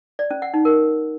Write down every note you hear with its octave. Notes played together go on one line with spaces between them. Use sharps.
D5
C#4
F#5
D#4
A#4